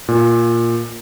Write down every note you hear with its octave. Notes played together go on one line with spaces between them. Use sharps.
A#2